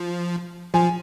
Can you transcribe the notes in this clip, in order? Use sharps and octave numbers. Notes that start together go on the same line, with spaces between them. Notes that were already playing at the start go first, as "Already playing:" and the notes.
Already playing: F3
F3 G#5